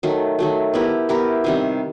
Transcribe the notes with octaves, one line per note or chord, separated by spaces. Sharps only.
D#3 F#3 A3
D#3 F#3 A3
B3 E4 G4 A#4
B3 E4 G4 A#4
C3 D#3 G3